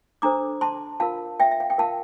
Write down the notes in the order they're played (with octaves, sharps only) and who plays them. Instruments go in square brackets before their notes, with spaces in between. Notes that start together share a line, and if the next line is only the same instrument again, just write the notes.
[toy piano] D4 A4 C5 A#5 D6
A5 C6
F4 A#4 F5 A5
E5 G5
E5
F5
G5
F4 A#4 F5 A5